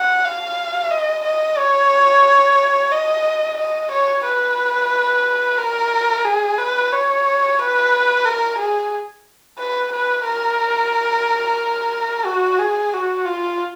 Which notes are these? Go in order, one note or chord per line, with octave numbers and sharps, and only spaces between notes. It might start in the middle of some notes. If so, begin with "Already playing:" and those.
Already playing: F#5
F5
D#5
D#5
C#5
D#5
D#5
C#5
B4
A#4
G#4
B4
C#5
B4
A#4
G#4
B4
B4
A#4
F#4
G#4
F#4
F4